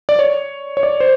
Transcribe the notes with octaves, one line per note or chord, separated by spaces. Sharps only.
D5
C#5
C#5
D5
C5